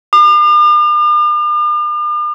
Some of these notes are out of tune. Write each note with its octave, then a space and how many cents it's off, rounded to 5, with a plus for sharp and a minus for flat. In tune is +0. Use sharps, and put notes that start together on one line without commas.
D6 +45